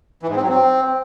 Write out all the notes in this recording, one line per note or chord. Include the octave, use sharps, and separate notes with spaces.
E3
G#2
C4
F#3
C4